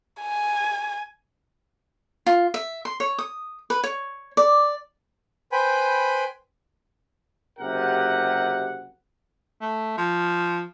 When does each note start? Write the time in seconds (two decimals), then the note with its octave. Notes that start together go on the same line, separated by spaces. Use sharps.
0.21 G#5
2.26 F4
2.54 E5
2.85 C6
3.00 C#5
3.18 D#6
3.70 B4
3.84 C#5
4.37 D5
5.52 B4 C5 G5 G#5 B5
7.59 F#1 C3 G4 A#4 F#5
9.61 A3
9.98 F3